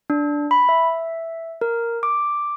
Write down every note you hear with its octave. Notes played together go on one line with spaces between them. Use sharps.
D4
B5
E5
A#4
D6